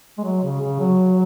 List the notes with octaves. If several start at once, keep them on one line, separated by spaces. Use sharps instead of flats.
G#3
F#3
C#3
C#3
F#3